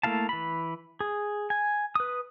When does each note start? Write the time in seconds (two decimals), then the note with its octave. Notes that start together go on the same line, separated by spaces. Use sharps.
0.03 A3 A#3 E4 F5 A5
0.29 E3 B5
1.00 G#4
1.50 G#5
1.95 B4 D#6